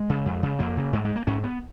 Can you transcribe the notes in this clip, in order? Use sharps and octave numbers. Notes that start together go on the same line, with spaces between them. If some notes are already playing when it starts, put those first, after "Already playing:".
Already playing: G#3
C#3
F2
C#3
F2 A#3
C#3
G#2 G#3
G#3
A#3
G#2 C#4
B3